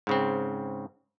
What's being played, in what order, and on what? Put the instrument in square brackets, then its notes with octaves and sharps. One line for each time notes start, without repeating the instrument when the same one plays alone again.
[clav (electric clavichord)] G#2 C#3 C4